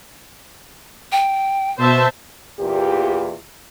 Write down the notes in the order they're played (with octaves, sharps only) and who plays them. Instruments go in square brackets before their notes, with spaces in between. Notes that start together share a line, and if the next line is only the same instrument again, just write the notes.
[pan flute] G5
[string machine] B2 [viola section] C5 E5 A5
[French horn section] E2 A#2 G4